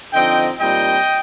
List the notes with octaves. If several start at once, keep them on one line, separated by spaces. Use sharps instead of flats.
D3 F3 C4 D#4 D#5 G5
A#2 G3 C4 D#4 D#5 G5